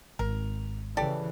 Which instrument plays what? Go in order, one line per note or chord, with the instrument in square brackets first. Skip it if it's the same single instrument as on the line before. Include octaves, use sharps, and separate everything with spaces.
[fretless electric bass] G#1 [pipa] A#4
[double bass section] C#3 E3 [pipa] G4 A4 D5